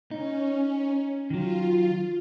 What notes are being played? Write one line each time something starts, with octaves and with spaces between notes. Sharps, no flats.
C#4 D#4
D#3 F#3 F4